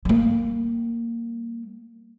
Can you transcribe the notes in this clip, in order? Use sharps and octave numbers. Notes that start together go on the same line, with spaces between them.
G3 A#3